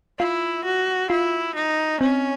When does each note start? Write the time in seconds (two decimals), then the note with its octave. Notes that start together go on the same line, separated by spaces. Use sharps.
0.19 E4 F4
0.65 F#4
1.10 E4 F4
1.55 D#4
2.01 C4 C#4